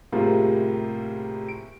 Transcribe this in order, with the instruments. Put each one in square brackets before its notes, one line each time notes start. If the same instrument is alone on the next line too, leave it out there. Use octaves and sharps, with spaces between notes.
[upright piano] A2 C3 G3 A#3 F4 G#4
D7